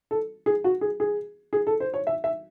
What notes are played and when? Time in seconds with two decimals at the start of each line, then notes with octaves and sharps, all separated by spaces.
0.11 A4
0.46 G#4
0.64 F#4
0.81 G#4
1.00 G#4
1.53 G#4
1.67 A4
1.80 C5
1.94 C#5
2.07 E5
2.24 E5